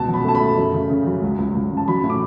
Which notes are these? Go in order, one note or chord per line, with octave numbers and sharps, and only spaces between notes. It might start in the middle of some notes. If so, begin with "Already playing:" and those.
Already playing: C#2 B2 A5
F#3
B5
A3 A5
B5
A3
F#2
C#3
C#3
F#3
C#2
C#2
C#2
C#3
A5
F#3 B5
A2
D6